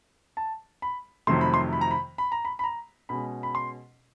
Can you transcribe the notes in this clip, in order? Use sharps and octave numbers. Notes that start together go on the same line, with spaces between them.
A5
B5
F2 C3 D#3 F#3 A3 C6
B5
C6
B5
A#5
B5
B5
A#5
B5
B5
A#5
B2 G#3 C#4 B5
B5
C6